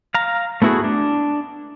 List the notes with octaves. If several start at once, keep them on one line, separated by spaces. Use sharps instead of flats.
F5 A#5
A3 B3 E4 F#4 G#4
D4